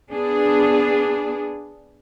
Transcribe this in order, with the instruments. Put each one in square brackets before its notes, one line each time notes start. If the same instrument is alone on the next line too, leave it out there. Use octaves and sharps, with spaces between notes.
[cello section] B3 D4 G#4